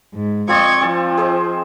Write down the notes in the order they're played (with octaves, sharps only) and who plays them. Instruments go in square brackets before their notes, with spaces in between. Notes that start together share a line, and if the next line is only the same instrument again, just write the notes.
[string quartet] G#2
[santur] F3 C4 D5 [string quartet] D#5 C#6 G#6
[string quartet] F3 [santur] C4 A5
[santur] G#4 C5 D#5